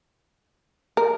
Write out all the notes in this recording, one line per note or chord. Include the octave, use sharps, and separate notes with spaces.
A#4